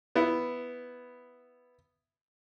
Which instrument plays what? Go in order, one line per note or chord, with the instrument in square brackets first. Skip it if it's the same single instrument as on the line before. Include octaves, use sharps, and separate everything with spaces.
[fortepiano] B3 E4